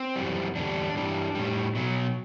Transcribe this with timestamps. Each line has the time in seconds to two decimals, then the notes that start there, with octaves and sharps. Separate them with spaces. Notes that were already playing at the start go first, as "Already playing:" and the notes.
Already playing: C4
0.16 F#2 E3 G3
0.55 E2 D3 G3 D4
0.95 G2 E3 G3
1.35 A2 G3
1.75 B2 F#3